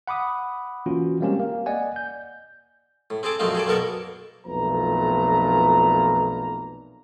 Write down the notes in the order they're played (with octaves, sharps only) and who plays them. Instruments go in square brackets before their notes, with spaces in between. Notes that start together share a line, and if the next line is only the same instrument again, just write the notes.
[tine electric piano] F#5 B5 D6 D#6
E3 A#3 C#4 F4 F#4
G3 G#3 A#3 C4 C#4 G4
A#3
D5 D#5 F#5 G#5
G6
[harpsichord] A2
C4 G#4 A4 D6
A#1 F#2 A3 C4 D#4 F5
G#4 A4 D5
B1 A#3 B3 A4 A#4 C#6
[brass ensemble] B1 F2 A#2 A3 B4 A#5